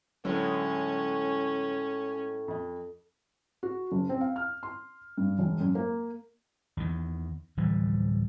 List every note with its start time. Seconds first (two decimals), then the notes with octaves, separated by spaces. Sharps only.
0.25 A2 D3 F#3 G#3 C#4 A4
2.48 F2 D#5
3.63 F#4
3.92 F#1
4.09 C4
4.21 F5
4.36 F6
4.63 C6
5.18 G2
5.39 E1
5.61 F#2
5.75 A#3
6.77 E2 D#3
7.57 D1 E3 F3 G3